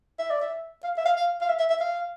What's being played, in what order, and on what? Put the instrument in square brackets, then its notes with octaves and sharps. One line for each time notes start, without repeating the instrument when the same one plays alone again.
[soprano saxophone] E5
D5
E5
F5
E5
F5
F5
F5
E5
E5
E5
F5